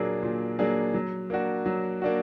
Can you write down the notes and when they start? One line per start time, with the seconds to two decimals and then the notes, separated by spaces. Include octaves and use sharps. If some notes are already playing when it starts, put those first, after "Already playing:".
Already playing: A#2 F#3 A#3 D4 G#4
0.23 A#2
0.59 F#3 A#3 D4 G#4
0.94 F#3
1.30 A#3 D4 F#4
1.66 F#3
2.02 A#3 D4 F#4